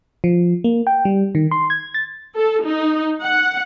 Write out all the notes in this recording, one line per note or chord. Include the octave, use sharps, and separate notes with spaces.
F3
A#3
G5
G3
D#3
C6
G#6
A6
A4
D#4
F#5